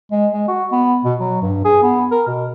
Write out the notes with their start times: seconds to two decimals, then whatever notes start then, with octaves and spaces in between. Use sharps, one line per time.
0.11 G#3
0.33 G#3
0.48 F#4
0.72 B3
1.05 B2
1.20 F#3
1.42 G2
1.65 G#4
1.83 B3
2.11 A#4
2.27 B2